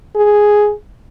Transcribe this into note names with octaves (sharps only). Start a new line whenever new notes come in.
G#4